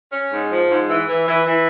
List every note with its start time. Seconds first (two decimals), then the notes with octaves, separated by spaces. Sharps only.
0.11 C#4
0.31 G#2
0.50 F3
0.69 G#2
0.89 E3
1.07 E3
1.27 E3
1.44 E3